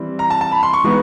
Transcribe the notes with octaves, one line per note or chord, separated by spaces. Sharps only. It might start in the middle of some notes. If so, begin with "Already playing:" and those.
Already playing: E3 G3 C4
A#5
A5
A5
B5
C6
C#6
E3 G#3 B3 D#4